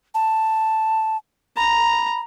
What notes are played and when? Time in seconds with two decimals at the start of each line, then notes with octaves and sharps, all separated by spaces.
0.14 A5
1.57 A#5 B5